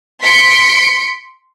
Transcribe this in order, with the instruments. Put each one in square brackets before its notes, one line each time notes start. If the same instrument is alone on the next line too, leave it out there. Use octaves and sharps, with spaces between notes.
[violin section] C6 B6 C#7 D7